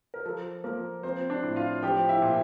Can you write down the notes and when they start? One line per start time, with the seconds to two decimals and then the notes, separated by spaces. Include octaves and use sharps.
0.14 A#4
0.25 F3 A4
0.64 F3 A#3 A#4
1.03 F3 C4 C5
1.30 D4 D5
1.43 A2
1.56 F4 F5
1.82 F3 G4 G5
2.09 E4 E5
2.22 A#2